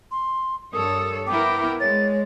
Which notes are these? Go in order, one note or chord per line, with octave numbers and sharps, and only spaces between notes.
C6
G2 A4 A#4 C#5 D#6
B3 E4 A#4 G5 D6
G#3 C#5 A6